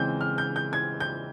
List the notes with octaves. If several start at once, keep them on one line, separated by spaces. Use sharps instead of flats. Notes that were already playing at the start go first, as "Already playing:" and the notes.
Already playing: C#3 E3 G#3 C4 G6
F6
G6
G6
G#6
G6